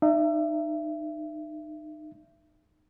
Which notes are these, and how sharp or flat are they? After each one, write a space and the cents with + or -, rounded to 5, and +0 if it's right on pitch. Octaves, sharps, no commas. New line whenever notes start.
D#4 -30 E5 +30